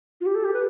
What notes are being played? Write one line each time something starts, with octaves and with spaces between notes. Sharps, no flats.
F4
G4
A4
G4
B4